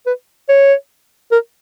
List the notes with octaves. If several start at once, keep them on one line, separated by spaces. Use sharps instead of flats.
B4
C#5
A#4